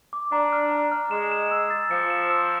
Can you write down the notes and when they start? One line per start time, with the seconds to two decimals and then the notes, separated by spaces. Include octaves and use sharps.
0.13 D6
0.32 D4 A#5
0.52 F6
0.72 A#5
0.92 F6
1.11 G#3 E7
1.32 E7
1.51 E6
1.70 A6
1.91 F3 C#7
2.10 E7
2.30 E6